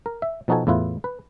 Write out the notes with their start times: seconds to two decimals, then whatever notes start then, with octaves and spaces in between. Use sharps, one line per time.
0.06 A#4
0.22 E5
0.48 B2 F3 D#4 F#4 A4 G#5
0.67 E2 A2 E4 F4 B4
1.04 B4